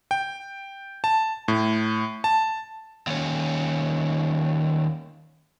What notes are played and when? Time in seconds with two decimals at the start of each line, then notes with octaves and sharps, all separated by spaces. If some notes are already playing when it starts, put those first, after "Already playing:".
0.11 G5
1.04 A5
1.48 A2
2.24 A5
3.07 D#2 C#4